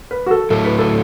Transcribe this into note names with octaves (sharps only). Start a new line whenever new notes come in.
B4
F#4
A4
A2 F#3 A3 A4
B4
A4